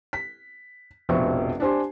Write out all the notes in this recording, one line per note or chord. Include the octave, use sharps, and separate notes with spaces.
B6
F1 A#1 B2 C5 E5 C#6
D4 G4 C5 G#5 C6